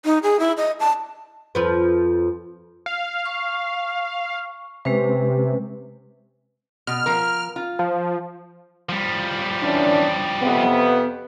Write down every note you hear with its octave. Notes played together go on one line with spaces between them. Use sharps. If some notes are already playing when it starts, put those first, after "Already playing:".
D#4
G#4
E4
D#5
A5
F2 F3 B4
F5
C#6
C3 G#3 C#4 B4
B2 F6
F3 A#4
F4
F3
F3 G3
E3 C#4 D4
F2 C3 B3